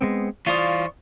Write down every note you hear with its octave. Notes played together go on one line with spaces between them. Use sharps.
G#3 B3 C4
E3 F4 C5 D5 F5 C#6 D#6